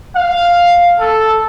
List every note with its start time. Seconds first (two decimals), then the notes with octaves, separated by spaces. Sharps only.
0.16 F5
1.00 A4